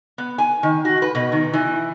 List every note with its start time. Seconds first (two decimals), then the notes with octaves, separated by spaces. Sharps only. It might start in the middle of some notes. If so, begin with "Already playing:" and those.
0.18 B3
0.38 G#5
0.63 D#3
0.85 F#4
1.02 B4
1.15 B2
1.32 D#3
1.53 E3